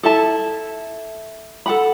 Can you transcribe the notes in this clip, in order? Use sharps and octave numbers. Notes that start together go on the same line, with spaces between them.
E4 A4 E5 A5
A4 F#5 B5